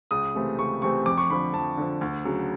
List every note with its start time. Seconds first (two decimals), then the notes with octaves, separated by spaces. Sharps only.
0.11 C#2 D#6
0.35 C3 E3 A3 C4
0.58 C#2 C#6
0.82 C3 E3 A3 C4 C#6
1.06 F2 D6
1.18 C#6
1.30 D3 F3 B5
1.54 F2 A5
1.77 D3 F3
2.01 D2
2.25 C#3 F#3